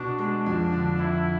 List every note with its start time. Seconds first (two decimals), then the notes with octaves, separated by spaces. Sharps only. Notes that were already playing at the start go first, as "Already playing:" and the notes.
Already playing: B2 D4
0.18 G#3
0.46 F2
0.72 D3
0.99 F2 E4